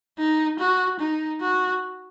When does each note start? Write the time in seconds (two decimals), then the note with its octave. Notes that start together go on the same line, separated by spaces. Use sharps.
0.19 D#4
0.59 F#4
1.00 D#4
1.41 F#4